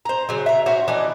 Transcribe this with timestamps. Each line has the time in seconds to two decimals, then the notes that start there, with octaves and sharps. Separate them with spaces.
0.05 C5 A#5
0.29 C#3 F#3
0.46 E5 A#5
0.66 C#4 F#4 C5 C#5
0.88 E3 B3 D4 D#4